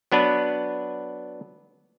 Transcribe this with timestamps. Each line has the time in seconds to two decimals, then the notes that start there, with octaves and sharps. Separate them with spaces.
0.12 F#3 B3 D4 B4